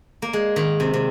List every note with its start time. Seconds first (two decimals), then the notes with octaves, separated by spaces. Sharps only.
0.22 A#3
0.33 G#3
0.56 D#3
0.80 C3
0.93 C3